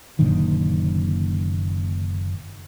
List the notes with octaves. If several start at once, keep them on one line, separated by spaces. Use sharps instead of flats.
F#1 A#2 D3 D#3